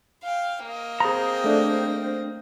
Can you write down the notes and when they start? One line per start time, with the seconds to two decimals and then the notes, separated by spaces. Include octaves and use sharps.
0.24 F5 G5
0.65 A#3 D#5
1.00 C4 G#4 C5 A#5
1.44 A3 D4